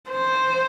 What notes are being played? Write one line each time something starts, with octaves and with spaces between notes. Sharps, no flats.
C5